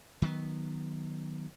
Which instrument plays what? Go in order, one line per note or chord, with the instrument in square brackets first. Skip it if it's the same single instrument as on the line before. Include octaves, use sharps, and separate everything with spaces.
[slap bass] D#3 F#3 A3 B3